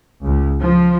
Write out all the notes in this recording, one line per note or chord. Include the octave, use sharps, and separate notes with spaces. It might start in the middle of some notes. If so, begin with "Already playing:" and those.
C#2
F3